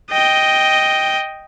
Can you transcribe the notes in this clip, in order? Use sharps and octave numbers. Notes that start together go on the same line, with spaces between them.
D#5 G5